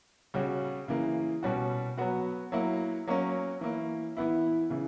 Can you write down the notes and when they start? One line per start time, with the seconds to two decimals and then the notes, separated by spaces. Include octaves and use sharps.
0.34 C#3 G3 C#4 F#4
0.88 C#3 E3 A#3
1.43 B2 G3 C#4 F#4
1.97 F#3 B3 F#4
2.52 F#3 A#3 E4
3.07 F#3 A#3 C#4
3.61 E3 A#3 E4
4.17 E3 B3 E4
4.70 C#3 E3